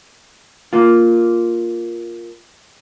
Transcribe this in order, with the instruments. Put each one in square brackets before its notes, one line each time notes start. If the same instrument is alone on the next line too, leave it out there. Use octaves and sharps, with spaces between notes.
[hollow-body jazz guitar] A#3 F4